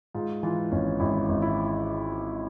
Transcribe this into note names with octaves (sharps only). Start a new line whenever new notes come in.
G#2 F4
E3 F4
G#1 C#4
G#1 E4
G#1
E4